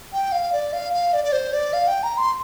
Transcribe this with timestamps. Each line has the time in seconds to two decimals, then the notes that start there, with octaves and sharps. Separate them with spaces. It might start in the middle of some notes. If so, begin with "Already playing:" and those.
0.13 G5
0.32 F5
0.53 D5
0.73 F5
0.93 F5
1.13 D5
1.24 D5
1.32 C5
1.53 D5
1.73 F5
1.88 G5
2.03 A#5
2.18 C6